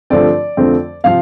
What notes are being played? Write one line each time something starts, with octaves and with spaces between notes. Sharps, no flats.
G2 D3 F3 A3 C4 D5
F2 D3 F3 A3 C4
C3 F3 F5